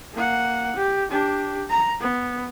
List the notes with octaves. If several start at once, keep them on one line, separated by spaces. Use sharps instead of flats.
A#3 F#5
G4
D4 G4
A#5
B3